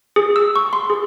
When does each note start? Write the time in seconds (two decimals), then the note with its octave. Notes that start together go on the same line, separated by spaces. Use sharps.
0.16 G#4
0.36 E6
0.56 C#6
0.73 C6
0.90 G#4